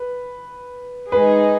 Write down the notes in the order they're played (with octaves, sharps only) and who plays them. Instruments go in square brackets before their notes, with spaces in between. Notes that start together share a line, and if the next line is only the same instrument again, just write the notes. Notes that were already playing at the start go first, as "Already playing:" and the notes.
Already playing: [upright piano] B4
[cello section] G#3 D#4 G#4 [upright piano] B4